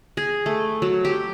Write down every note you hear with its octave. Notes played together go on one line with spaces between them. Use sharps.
G#4
A3
F#3
G4